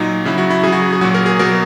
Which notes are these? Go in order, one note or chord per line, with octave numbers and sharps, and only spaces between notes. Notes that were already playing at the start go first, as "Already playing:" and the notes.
Already playing: A#2 F#3 D#4
C#3 F#3 E4
F#4
E4
C#3 F#3 G#4
F#4
G#4
G#4
A#2 F#3 F#4
A#4
G#4
B2 F#3 A#4